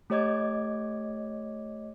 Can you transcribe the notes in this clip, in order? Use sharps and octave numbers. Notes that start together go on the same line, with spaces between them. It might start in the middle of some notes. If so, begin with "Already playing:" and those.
A3 G4 C#5 D#5 D6 G#6